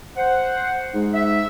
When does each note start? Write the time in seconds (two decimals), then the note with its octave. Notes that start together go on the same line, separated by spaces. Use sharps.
0.16 C5 F#5
0.94 G#2
1.14 E5